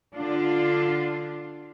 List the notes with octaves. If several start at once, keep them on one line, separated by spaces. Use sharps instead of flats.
D3 D4 F4